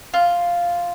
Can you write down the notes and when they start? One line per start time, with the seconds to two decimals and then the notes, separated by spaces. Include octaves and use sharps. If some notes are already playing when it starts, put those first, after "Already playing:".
0.14 F4